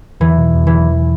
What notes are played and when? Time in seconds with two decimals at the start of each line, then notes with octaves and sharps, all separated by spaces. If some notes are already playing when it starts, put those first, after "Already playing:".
0.20 E2 E3
0.38 B2
0.55 E2
0.67 E3